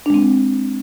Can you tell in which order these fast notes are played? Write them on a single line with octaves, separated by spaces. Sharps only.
D4 G#3 C4